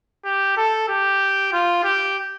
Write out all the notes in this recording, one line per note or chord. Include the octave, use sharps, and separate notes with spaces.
G4
A4
G4
F4
G4